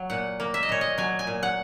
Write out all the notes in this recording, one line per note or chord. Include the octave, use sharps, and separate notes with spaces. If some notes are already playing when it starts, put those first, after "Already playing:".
Already playing: F#3
A#2 F#5
A#3
E5
D#5
A#2 C#5
D#5
F#3 G#5
G#5
A#2
F#5